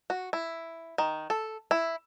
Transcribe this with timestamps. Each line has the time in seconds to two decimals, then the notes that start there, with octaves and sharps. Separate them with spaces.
0.10 F#4
0.33 E4
0.98 D#3
1.30 A4
1.71 E4